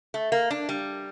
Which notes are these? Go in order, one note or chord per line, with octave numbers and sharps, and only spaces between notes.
A3
A#3
D4
G3